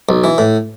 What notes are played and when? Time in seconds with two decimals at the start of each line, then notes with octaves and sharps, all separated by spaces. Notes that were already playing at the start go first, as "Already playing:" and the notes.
0.09 B1
0.24 E3
0.38 A2